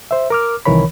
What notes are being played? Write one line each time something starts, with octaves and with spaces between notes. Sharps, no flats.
C5 E5
A#4 D6 F6
C2 D#3 E3 A#4 C#5 B5